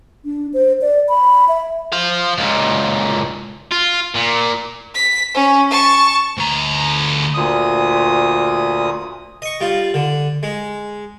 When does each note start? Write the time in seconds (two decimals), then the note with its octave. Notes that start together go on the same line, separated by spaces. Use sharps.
0.25 D4
0.54 C5
0.81 D5
1.09 B5
1.48 E5
1.92 C5 F5
2.39 C#2 A#2
3.71 F4
4.14 A#2
4.94 B6
5.34 C#4
5.70 A5 C#6
6.37 D2 A#5
7.34 D2 A#2 D#6
9.42 D#5 C#6
9.60 G3 F4
9.94 D3
10.43 G#3